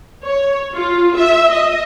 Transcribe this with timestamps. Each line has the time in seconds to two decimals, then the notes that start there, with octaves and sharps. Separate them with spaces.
0.25 C#5
0.74 F4
1.18 E5
1.51 D#5